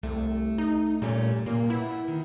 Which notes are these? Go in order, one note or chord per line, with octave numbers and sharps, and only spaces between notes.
C2 A3
D#4
A#2 G3 A3 C#4
A#2 A#3
B3 E4
D#3